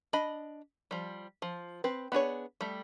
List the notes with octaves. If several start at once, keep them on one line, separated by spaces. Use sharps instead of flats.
D4 D#5 B5
F3 G3
F3
C4 B4
B3 D4 G#4 C#5
G3 A3